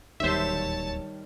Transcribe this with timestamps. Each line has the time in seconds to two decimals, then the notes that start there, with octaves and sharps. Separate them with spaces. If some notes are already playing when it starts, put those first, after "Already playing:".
0.20 D1 D#2 D#3 G3 C5 C#5 E5 A5